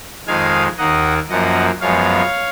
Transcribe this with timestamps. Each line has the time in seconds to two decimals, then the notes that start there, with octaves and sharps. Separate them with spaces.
0.27 F2 D#3 G#3 F5 G#5
0.78 D#2 D#3 A#3 D#5 F#5
1.29 F#2 F3 A#3 D#5 F#5
1.81 F#2 F3 G#3 B3 C#5 F5